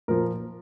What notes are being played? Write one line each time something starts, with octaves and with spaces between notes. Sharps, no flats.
A#2 F3 A#4